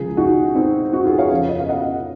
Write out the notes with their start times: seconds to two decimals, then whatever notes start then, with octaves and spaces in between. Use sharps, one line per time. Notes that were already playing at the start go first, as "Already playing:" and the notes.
Already playing: C#2 C#3 F3 F4 G#4
0.17 D#4 F#4
0.55 C4 D#4
0.93 D#4 F#4
1.06 F4 G#4
1.18 C#5 F5
1.31 F2 C#3 F3
1.49 D#5
1.59 F5
1.69 D#5 F#5